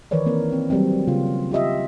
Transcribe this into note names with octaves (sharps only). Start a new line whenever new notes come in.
D#3 E3 A#4 B4 C#5 D5
A#3 C4 A#4
C4
F#3 G3 C4
C#3 A#3 F4
F4 G4 D#5 E5